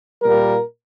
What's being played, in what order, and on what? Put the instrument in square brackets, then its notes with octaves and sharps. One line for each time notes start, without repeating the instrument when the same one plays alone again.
[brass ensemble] A#2 G3 A#3 A#4